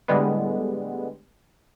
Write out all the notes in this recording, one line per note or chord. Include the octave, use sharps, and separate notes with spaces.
A2 D3 G3 G#3 B3